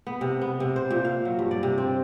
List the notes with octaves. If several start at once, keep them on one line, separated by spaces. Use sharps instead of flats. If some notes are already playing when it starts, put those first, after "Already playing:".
B3
C3
B3
C3
C5
A#2
F5
F#3
G2
D5
C3
C4